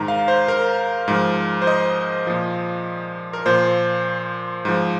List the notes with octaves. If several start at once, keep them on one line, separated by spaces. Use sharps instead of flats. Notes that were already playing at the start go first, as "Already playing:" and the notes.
Already playing: G#2 D#3 A#5
F5
C5
A#4
G#2 F3
C5
D#5
A#2 F3
A#4
A#2 F3 C5
G#2 F3